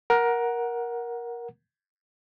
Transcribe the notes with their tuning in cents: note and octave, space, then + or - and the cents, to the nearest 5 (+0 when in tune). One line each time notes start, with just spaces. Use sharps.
A#4 +15 F#5 +0